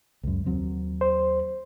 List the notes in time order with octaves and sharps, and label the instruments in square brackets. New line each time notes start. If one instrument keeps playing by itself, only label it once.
[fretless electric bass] C#2 F#2
D#2 F#3 C4
[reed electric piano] C5